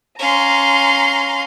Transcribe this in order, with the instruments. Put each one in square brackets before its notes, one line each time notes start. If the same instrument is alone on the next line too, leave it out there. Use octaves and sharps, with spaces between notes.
[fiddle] C#4 F5 [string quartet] A#5 C6